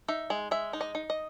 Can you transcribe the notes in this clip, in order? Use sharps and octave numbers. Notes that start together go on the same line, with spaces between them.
D#4 E5
G#3
G#3 E5
D#4
D#5
D#4
D#5